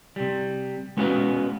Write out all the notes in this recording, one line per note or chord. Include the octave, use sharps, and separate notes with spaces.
C3 G3
G#3 B3 C#4 F#4 B4 F5